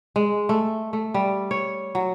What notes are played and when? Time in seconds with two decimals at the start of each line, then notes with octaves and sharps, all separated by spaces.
0.16 G#3
0.49 A3
0.93 A3
1.14 G3
1.51 C#5
1.95 F#3